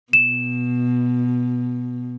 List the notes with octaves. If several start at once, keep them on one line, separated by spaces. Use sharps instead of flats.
B2 E7